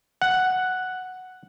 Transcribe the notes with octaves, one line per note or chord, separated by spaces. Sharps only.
F#5